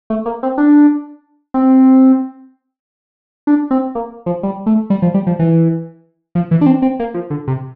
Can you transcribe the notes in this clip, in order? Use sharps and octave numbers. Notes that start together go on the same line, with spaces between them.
A3
A#3
C4
D4
C4
D4
C4
A#3
F3
G3
A3
G3
F3
G3
F3
E3
F3
E3
D4
C4
C4
A#3
F3
D3
C3